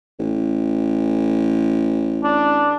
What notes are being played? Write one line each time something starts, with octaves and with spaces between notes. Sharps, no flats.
A1
D4